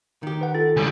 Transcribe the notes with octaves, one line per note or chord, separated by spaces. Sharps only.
D#3 G4
B4 F#5
F4 A4 A6
C#2 G3 G#5